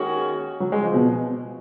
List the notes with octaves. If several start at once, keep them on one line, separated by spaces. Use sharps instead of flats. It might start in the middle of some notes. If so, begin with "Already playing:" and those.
Already playing: D#2 D#3 G#3 C#4 F#4
F#3
G#3
F3
B2